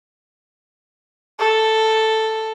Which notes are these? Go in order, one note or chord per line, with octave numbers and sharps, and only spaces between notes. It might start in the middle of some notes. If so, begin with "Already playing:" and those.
A4